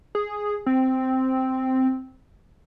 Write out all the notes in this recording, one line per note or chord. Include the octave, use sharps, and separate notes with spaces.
G#4
C4